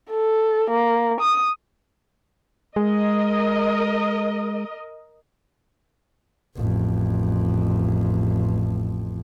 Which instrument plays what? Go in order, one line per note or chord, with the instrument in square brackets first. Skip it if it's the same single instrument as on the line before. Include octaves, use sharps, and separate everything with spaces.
[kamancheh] A4
A#3
D#6
[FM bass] G#3 [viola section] A#4 D#5
[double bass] A1 F2